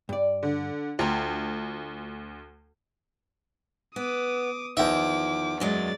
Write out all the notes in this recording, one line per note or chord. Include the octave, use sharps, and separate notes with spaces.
G2 D5
D3
D2 F4 G5 A#5
B3 D6 D#6
E2 D#3 F3 E5 D6
F#2 F#3 G#3 D5 A6